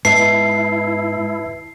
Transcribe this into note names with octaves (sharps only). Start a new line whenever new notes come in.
G#2 B3 E4 B4 E5 A5 C7